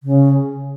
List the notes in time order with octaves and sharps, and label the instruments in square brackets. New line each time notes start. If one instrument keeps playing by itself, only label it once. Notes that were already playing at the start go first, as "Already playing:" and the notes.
[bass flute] C#3